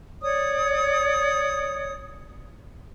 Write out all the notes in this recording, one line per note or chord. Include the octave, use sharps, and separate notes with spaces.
C#5 D5 D#6